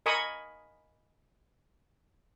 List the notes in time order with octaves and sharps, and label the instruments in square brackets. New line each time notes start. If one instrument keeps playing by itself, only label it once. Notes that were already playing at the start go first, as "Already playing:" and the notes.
[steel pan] A#4 D#5 G#5 B5 C#6 D#6